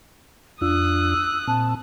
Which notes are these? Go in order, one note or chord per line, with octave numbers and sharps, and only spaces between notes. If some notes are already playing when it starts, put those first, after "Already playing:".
F2 D4 F4 D#6 E6 F#6
A#2 C4 A5